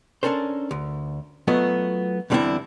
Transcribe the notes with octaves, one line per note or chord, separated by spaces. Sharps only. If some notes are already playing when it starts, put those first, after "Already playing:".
C#4 D4 A4 A#4 C5
D2
F#3 A3 B3 F4 D#5
E2 D3 G3 C4 D4 E4